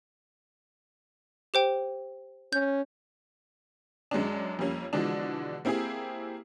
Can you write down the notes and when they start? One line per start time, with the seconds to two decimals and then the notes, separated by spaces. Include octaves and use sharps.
1.54 G4 C5 G5
2.53 C#4 G6
4.11 F#2 G#3 C#4 D4
4.59 F2 F3 G3 A#3 C#4
4.93 B2 D3 E3 F3 G#3 D4
5.65 A#3 C4 E4 G4 G#4